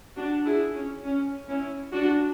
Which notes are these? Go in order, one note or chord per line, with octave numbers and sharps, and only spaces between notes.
D4 F#4
E4 G#4
C#4
C#4
C#4 E4
D4 F#4